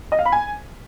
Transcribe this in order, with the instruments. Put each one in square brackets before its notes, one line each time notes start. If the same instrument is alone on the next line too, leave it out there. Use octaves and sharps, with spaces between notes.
[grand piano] D#5
F5
B5
G#5